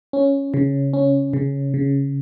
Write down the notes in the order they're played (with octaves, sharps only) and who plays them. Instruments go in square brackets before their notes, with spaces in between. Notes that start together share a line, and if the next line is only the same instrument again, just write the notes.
[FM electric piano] C#4
C#3
C#4
C#3
C#3